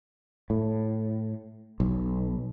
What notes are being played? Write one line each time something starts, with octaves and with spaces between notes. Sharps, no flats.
A2
B1